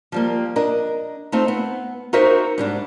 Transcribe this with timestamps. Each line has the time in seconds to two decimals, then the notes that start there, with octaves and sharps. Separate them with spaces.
0.12 F3 G3 A#3
0.56 D4 A#4 D#5
1.32 A3 C4 D#4 F4
1.48 B3
2.13 D#4 F#4 A#4 C5 E5
2.58 G#2 G3 D4